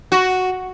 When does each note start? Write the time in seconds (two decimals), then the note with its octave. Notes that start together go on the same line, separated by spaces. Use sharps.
0.12 F#4